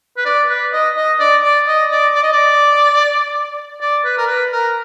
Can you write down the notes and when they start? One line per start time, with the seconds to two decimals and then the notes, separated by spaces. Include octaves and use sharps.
0.17 B4
0.25 D5
0.49 B4
0.73 D#5
0.97 D#5
1.19 D5
1.44 D5
1.67 D#5
1.91 D5
2.15 D5
2.23 D#5
2.33 D5
3.81 D5
4.05 B4
4.18 A#4
4.27 B4
4.52 A#4